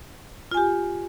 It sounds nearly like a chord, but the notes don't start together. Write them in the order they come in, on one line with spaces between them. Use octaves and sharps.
F4 G#5 G4